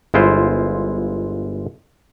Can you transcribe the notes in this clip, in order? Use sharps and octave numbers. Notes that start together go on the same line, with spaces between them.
G1 G#3 E4 F4 C5